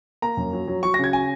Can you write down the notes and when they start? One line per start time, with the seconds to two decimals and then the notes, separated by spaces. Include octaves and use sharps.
0.22 A#3 A#5
0.37 F#2
0.53 F#3
0.67 F#3
0.83 F#3 C#6
0.94 A#6
0.99 C#3 G#6
1.13 G#5